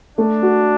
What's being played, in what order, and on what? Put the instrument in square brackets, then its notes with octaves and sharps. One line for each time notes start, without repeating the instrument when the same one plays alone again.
[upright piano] A3 [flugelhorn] D4
[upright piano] F#4